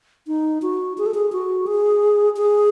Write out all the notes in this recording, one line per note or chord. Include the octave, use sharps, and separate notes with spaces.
D#4
F#4
G#4
A4
G#4
F#4
G#4
G#4